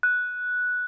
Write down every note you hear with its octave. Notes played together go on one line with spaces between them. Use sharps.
F#6